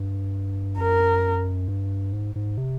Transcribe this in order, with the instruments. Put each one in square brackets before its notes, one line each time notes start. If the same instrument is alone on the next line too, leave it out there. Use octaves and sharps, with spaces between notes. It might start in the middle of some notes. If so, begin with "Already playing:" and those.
Already playing: [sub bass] G2
[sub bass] F#2 [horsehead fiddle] A#4
[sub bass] G2
G#2
G#2
C3